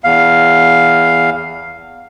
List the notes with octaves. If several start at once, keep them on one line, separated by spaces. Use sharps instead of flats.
E2 F5